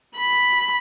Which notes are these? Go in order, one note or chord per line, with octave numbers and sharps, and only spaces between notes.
B5